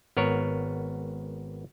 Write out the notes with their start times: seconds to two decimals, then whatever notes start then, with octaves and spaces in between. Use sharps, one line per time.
0.17 G#1 B3 A#4 C#5